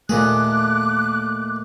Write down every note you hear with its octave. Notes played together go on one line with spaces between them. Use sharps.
D#2 A#2 A3 G#4 D6 F#6